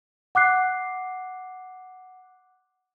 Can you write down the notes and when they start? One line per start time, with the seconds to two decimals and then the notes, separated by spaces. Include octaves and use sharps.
0.35 F#5 D6 F#6 C7